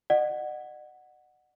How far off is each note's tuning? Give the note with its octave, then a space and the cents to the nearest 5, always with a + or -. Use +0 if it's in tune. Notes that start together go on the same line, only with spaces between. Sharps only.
D#5 -45 F#5 +0